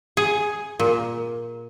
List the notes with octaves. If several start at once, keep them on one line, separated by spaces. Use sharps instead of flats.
G#4
A#2